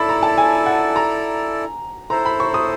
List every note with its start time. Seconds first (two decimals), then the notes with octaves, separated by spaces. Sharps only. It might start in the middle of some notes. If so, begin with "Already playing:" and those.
Already playing: E4 A4 D5 A5 B5
0.09 A#5
0.23 A5
0.38 G#5
0.66 F#5
0.96 A#5
2.10 E4 A4 C5 A#5
2.25 B5
2.40 C#6
2.54 D#6